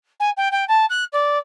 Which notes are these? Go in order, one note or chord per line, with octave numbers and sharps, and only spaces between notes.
G#5
G5
G5
A5
F#6
D5